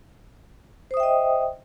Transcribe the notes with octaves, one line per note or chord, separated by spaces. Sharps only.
C5 D#5 E5 G5 D#6